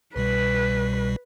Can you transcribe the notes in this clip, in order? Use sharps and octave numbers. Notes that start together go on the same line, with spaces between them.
C2 B2 G3 B4